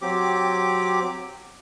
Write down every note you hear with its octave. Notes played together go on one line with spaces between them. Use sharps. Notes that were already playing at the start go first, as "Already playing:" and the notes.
F#3 C4 G4 D6